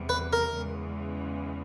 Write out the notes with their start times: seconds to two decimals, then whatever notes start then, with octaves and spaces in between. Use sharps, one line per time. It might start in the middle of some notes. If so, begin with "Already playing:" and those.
Already playing: E2 C3 E3 G3
0.09 B4
0.33 A#4
0.55 E2 C#3 E3 G#3